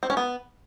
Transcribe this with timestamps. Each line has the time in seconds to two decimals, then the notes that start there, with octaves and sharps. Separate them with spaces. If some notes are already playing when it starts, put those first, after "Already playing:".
0.03 C4
0.10 C#4
0.17 B3